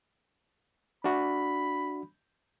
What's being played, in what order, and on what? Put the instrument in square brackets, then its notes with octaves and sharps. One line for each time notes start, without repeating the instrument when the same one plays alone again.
[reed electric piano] D4 F#4 [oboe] B5